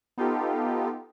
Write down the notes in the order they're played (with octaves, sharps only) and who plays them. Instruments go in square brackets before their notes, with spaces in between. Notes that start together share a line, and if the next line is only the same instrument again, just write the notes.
[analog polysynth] B3 D#4 F4 G4 A4